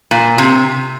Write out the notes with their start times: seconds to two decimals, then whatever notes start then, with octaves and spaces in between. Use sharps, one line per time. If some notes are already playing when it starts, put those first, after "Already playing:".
0.11 A#2
0.38 C3